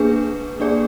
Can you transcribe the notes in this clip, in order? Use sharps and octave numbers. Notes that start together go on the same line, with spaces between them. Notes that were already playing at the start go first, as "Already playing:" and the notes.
Already playing: A#3 D4 G#4 B4
A#3 D4 G#4 D5